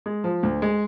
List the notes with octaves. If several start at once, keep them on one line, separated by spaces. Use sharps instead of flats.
G#3
F3
D2
G#3